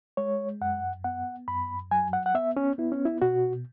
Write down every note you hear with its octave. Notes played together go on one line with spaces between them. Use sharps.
G#3 C#5
F#2 F#5
B3 F#5
F#2 B5
F#3 G#5
F#5
F#5
B3 E5
C#4
B3 E4
C#4
E4
B2 F#4